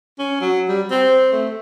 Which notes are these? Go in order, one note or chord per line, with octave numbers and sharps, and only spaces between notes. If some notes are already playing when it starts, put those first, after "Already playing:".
C#4
F#3
G3
C4
A3